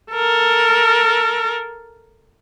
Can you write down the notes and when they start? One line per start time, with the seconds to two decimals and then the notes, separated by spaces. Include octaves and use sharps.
0.12 A4 A#4